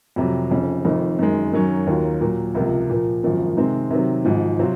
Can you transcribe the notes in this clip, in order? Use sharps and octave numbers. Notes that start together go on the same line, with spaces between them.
F2 C3 F#3
F1 F2 C#3
F1 F2 D#3
F#2 D#3 G#3
F#2 D#3 F#3 C#4
D#2 D#3 F#3 A#3 F4
A#2 F#3 A#3
C#2 C3 F3 A#3
A#2 F3 A#3
G#1 F#2 F3 A#3
C3 D#3 G#3 C4
C3 D#3 F#3 C4
G#1 G#2 F3
C3 F#3 C4 F4